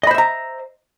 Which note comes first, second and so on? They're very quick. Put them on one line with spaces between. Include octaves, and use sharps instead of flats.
D#5 B5 C5 E5 A#5